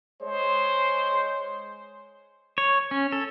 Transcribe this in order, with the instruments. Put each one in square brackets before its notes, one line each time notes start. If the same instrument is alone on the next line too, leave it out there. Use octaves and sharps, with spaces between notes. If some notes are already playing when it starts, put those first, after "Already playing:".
[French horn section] G#3 C#5 [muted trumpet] C5
[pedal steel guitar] C#5
C#4
A4